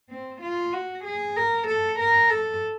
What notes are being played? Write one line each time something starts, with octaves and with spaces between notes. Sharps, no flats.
C4
F4
F#4
G#4
A#4
A4
A#4
A4